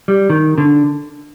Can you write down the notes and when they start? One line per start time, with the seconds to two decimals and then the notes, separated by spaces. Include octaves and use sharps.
0.08 G3
0.30 D#3
0.58 D3